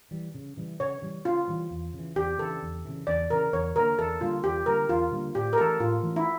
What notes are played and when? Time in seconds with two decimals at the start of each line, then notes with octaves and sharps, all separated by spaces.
0.11 E3 G3
0.35 C#3
0.57 E3 G3
0.80 C#3 C#5
1.02 E3 G3
1.25 C#3 F4
1.48 E3 G3
1.71 E2
1.94 C#3 E3
2.16 E2 G4
2.39 C#3 E3 A4
2.63 E2
2.85 C#3 E3
3.07 E2 D5
3.30 C#3 E3 A#4
3.53 E2 C#5
3.75 D3 G3 A#4
3.80 A#3
3.98 E2 A4
4.21 D3 G3 A#3 F4
4.43 E2 G4
4.66 D3 G3 A#3 A#4
4.89 E2 F4
5.12 D3 G3 A#3
5.35 A2 G4
5.53 A#4
5.58 E3 A3 C#4 A4
5.80 A2 F4
6.03 E3 A3 C#4
6.16 E4